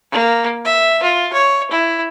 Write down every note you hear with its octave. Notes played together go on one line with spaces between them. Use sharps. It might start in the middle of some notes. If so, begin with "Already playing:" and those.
A#3
E5
F4
C#5
E4